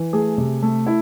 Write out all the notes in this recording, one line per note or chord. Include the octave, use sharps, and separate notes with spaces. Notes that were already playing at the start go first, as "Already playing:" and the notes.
Already playing: E3
A3 G#4
C3
A3
E4